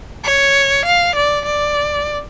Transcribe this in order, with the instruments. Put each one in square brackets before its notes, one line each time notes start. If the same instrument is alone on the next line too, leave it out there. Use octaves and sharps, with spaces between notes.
[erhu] C#5
F5
D5
D5